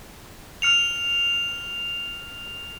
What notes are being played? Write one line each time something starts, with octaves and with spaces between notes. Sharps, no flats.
F6 C#7 F7